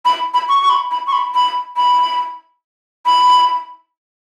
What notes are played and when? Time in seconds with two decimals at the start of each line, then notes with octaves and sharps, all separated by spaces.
0.05 B5
0.34 B5
0.49 C#6
0.62 C#6
0.70 B5
0.91 B5
1.07 C#6
1.13 B5
1.35 B5
1.77 B5
3.06 B5